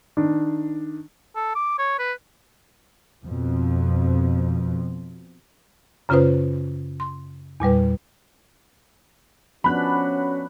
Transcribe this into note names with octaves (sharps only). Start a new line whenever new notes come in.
D#3 D4
A4
D6
C#5
B4
F2 B2 F3
F#2 C#3 C#4 F4 B4 C5
C6
E2 A#2 G3 B4
F3 B3 C#4 D4 F#4 B5 F#6